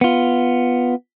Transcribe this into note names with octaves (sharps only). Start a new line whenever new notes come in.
B3 F4